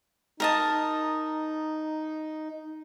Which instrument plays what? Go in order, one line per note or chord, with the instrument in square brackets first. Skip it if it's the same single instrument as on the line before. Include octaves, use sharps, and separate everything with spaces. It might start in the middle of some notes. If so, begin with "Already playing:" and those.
[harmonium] D#4 [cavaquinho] A#4 D#5 A5